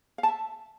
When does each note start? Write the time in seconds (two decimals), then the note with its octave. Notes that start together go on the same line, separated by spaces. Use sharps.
0.18 F5
0.23 A5
0.28 E5